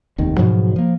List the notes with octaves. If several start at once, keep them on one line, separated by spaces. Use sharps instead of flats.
F1 D#2 D#3
G#2 B2 F3 F#3
F3 A#3